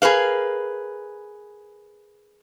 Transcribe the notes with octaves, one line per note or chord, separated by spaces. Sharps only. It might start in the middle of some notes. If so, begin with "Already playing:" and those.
G#4 A#4 B4 F5